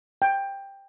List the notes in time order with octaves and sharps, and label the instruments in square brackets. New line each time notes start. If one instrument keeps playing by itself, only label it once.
[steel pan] G5